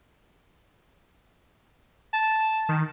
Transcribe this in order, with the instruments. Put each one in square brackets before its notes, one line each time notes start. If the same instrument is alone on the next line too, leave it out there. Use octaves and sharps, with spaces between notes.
[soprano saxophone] A5
[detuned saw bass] D#3